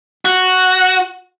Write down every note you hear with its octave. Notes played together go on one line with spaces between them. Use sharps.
F#4